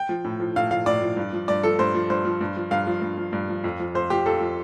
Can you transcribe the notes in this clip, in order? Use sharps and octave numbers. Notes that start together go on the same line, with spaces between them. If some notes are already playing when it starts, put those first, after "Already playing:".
Already playing: G5
F3
A2
F3
A2 F5
F3 F5
A2 D5
F3
G2
F3
G2 D5
F3 A4
G2 C5
F3
G2 C5
F3
G2
F3
G2 F5
F3
G2
F3
G2
F3
F2
F3
F2 C5
F3 G4
F2 A4
F3